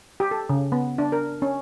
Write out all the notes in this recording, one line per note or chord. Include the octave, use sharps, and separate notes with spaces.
G4
A4
C#3
B3
D4
A#4
C#4